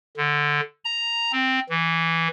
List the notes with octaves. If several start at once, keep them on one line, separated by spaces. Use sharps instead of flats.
D3
A#5
C4
E3